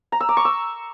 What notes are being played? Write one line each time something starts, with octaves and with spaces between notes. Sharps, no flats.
A#5
E6
D6
C#6
E6